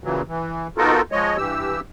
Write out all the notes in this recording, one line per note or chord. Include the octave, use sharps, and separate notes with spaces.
A#2 C#3 E3 F#3
E3
B3 D#4 F4 F#4 A4 A#4
F3 G#3 C#5 D#5
G2 E3 G4 E6